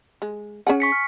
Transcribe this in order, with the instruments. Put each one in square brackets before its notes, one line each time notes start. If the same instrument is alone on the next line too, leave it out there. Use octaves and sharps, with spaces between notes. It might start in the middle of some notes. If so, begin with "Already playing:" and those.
[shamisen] G#3
[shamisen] C#4 G#4 F#5 [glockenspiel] G#5
[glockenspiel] C#6 B6 C#7
F6